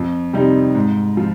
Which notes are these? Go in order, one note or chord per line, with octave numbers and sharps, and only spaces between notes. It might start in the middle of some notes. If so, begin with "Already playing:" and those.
Already playing: F2
C3 G3 C4 D#4
G#2
F3